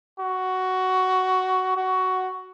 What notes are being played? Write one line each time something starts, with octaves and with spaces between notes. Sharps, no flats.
F#4
F#4